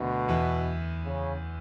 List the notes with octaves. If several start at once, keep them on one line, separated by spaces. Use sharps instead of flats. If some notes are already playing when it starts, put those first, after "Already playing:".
Already playing: D2 B2 D3
E2 E3
C#3